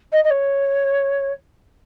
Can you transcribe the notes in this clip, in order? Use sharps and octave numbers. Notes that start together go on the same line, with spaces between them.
D#5
D#5
C#5